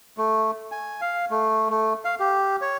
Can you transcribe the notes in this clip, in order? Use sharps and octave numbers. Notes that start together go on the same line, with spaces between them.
A3
G#5
F5
A3
A3
F5
G4
C#5